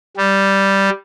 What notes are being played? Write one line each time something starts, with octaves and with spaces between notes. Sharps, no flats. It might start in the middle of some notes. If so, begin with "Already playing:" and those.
G3